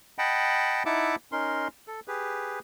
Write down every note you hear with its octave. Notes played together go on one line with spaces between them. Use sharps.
D#5 F#5 G5 A5 B5
D#4 E4 E5 F#5 A5 D6
C#4 D#4 A#4 C6
A4
G4 G#4 B4